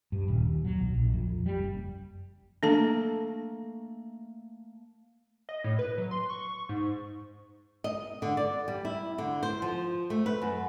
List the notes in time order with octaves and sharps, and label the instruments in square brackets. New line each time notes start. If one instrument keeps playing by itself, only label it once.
[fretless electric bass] G2
D#1
D#2
F#3
B1
A#1
F2
F2
G3
F#1
[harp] A3 A#3 [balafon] D4 A4 A5
[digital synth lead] D#5
A2
B4
F#3
C6
C#6
G#2
[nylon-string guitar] D#5
D3
D5
G3
E4
D3
C5
F3
A3
B4
F#2